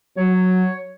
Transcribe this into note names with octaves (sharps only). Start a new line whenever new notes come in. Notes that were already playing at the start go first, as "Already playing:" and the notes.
F#3 C#5